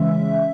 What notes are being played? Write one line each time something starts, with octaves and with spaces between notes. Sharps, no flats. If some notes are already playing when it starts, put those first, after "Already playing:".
Already playing: C#3 E3 G#3 C#4 E5